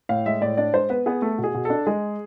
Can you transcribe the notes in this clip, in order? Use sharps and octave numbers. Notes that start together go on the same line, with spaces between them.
A2 F5
G#3 E5
A2 D5
D4 D5
G#3 C5
B3 B4
B3 G#4
A3 A4
B2
G#4
B2
D4 A4
G#3 G#4